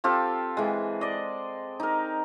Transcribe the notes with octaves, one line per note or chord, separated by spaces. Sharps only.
C4 F4 G4 A4
E3 G#3
D5 D#5
D#4 A#4